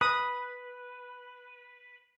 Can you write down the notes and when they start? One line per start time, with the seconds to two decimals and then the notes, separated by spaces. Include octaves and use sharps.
0.01 B4 D#6